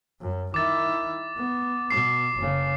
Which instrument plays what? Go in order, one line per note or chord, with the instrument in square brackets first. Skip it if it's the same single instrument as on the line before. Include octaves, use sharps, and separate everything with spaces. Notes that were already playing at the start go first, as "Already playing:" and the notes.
[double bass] F#2
[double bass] D#3 E4 [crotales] D6 A6
[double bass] B3
[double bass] B2 [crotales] D6 C7
[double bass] F#1 C#3